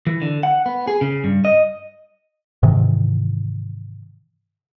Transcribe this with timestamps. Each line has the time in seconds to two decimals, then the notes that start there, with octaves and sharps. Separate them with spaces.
0.07 E3
0.22 D3
0.43 F#5
0.66 B3
0.88 G#4
1.01 C#3
1.24 G2
1.45 D#5
2.63 G#2 C3 D#3 E3